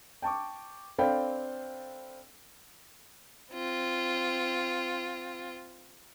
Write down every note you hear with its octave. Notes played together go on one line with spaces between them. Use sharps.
G5 A5 C#6 D6
C4 D4 A4 F5 G5 B5
C4 F4